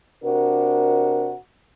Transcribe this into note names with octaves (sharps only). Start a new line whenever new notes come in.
C3 D4 F#4 A#4